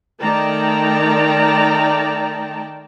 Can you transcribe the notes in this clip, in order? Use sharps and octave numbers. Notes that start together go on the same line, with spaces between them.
D#3 A3 D5 G5 A5 A#5